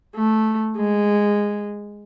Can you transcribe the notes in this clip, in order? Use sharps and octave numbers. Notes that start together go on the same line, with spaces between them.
A3
G#3